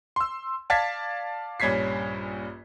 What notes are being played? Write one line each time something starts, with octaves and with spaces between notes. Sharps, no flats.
C6 E6
D5 F5 A5 G#6 A6 B6
A#1 G2 C#4 G#6 B6 C7